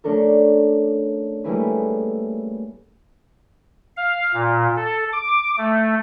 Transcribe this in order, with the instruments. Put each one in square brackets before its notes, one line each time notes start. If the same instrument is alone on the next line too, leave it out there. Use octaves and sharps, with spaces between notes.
[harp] A3 C#4 D4 A4 A#4
G3 A3 A#3 E4 G#4 B4
[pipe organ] F5
A#2
A4
D6
A3